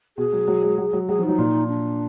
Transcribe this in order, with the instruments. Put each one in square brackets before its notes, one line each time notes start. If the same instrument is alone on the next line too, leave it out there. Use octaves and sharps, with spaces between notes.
[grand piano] B2 [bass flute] G#4
[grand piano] F#3
F#3
G#3
F#3
F#3
[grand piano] F#3 [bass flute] G#4
[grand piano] F3
[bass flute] D#4
[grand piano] F#3
A#2
[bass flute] D4